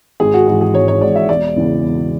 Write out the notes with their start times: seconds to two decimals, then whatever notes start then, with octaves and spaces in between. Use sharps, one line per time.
0.20 G#1 G#4
0.34 F#4
0.47 G#2 E3 F#4
0.61 G#4
0.74 G#1 C#5
0.88 C#5
1.01 G#2 E3 D5
1.16 E5
1.29 E1 D5
1.56 E2 C#3 E3
1.83 E1